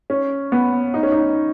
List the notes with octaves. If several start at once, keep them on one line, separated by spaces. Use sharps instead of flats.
C#4
B3
D#4
C#4
D#4